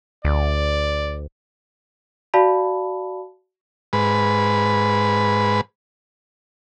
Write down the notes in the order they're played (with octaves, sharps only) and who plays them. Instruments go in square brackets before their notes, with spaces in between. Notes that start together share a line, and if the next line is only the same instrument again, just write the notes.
[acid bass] D2 [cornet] D5
[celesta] F#4 D5 F5 A5 B5
[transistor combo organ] G#2 B4